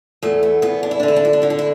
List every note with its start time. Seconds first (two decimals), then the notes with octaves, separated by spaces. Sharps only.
0.22 E2 A3
0.43 B3
0.62 E2 B3
0.83 D4
0.91 E4
1.00 D3 D4
1.08 E4
1.16 D4
1.25 E4
1.33 D4
1.42 D3 E4
1.50 D4
1.59 E4